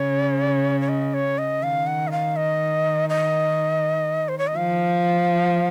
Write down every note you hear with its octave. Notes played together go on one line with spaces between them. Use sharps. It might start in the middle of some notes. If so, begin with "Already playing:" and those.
Already playing: C#3 C#5
C#5
D#5
C#5
D#5
D#3 F5
F#5
D#5
F5
D#5
D#5
C5
C#5
D#5
F3 F5